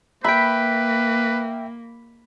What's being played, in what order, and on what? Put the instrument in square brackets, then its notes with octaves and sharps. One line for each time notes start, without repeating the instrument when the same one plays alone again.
[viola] A#3 [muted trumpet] B4 [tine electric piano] E5 G5 [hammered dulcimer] B5